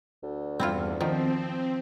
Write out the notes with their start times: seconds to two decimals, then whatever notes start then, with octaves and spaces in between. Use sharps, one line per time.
0.23 D2
0.60 E2 G2 C4 E4 F4
1.01 D#3 F3 C4